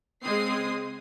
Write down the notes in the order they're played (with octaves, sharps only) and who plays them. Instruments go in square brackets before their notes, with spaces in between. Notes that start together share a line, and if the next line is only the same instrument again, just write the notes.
[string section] C#3 G#3 C4 D#6 C7